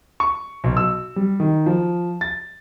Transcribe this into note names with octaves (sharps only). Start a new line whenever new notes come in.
C#6
B1
E6
G3
D#3
F3
A6